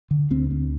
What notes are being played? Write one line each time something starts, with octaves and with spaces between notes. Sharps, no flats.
D3
D2 C4
D2